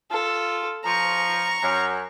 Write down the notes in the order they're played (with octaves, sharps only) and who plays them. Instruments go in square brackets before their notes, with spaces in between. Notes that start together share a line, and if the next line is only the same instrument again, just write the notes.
[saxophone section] F4 [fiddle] A4
[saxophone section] F3 [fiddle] A#5 C#6
[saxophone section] F#2